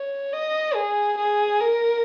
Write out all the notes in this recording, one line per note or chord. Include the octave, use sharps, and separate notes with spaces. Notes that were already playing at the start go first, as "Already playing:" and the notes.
Already playing: C#5
D#5
G#4
G#4
A#4